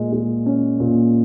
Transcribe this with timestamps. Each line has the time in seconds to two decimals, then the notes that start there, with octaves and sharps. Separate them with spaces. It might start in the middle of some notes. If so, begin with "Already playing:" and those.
Already playing: A#2 G#3
0.13 G#3
0.46 C#4
0.80 A#2